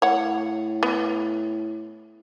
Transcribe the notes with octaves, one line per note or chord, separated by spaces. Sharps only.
A2 C#5 F#5
B3